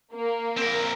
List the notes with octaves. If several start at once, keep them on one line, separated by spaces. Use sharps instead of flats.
A#3
C4 A#4